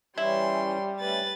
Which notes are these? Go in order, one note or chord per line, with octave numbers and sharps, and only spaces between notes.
E3 G3 C#4 E4 C6
A3 C#4 B4 A6